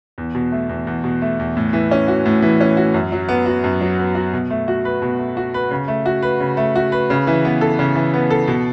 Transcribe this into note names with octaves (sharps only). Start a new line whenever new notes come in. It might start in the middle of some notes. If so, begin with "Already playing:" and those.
E2
B2
A3
E2
E2
B2
A3
E2
A2
E3
C#4
F#4
A2
E3
C#4
F#4
F#2
F#3
B3
F#4
F#2
F#3
B3
F#4
B2
A3
F#4
B4
B2
A3
F#4
B4
C#3
A3
F#4
B4
C#3
A3
F#4
B4
C#3
E3
B3
A4
C#3
E3
B3
A4
B2